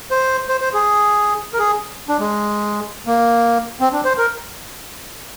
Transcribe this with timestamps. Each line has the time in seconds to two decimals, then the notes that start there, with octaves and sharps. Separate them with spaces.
0.11 C5
0.49 C5
0.61 C5
0.73 G#4
1.53 A#4
1.58 G#4
2.09 D4
2.20 G#3
3.07 A#3
3.80 C4
3.92 D4
4.05 C5
4.18 A#4